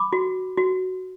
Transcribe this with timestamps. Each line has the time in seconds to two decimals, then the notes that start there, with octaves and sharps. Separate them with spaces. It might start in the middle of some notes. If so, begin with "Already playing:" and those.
Already playing: B5 D6
0.13 F#4
0.58 F#4